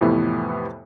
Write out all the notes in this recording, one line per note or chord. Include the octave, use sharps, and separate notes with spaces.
F2 A2 C3 E3 B3 E4